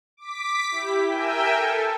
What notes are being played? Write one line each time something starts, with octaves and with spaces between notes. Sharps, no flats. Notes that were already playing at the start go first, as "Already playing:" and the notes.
D6 B6
E4 G4
A#4 E5 G5 G#5
A4